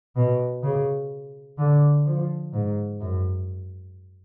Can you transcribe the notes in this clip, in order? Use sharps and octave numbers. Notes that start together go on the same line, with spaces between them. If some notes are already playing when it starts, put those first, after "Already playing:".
B2
C#3
D3
F3
G#2
F#2